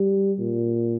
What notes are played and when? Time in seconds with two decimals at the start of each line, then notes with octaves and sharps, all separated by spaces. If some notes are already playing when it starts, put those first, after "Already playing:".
Already playing: G3
0.39 A#2